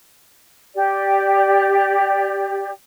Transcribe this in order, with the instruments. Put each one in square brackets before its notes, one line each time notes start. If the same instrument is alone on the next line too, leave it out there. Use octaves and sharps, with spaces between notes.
[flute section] G4 D5